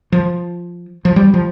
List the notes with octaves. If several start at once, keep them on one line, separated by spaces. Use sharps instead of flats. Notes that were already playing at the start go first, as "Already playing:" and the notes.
F3
F3
G3
F3